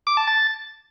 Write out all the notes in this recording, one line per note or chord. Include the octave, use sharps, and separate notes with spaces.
D6
A5
A6